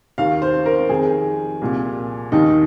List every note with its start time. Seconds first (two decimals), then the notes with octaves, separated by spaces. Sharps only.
0.18 D#2 D#3 F5
0.42 C5
0.66 A#4
0.89 F2 D#3 G#4
1.62 C2 A#2
2.32 D#2 D#3 D#4